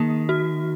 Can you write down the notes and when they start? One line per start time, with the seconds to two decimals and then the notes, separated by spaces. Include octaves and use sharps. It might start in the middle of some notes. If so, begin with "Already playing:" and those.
Already playing: D#3 A#3
0.29 F#4